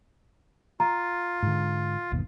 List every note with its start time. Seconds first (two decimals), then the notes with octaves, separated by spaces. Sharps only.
0.80 F4 A#5
1.43 G#2 D3
2.12 G1 D#2 B2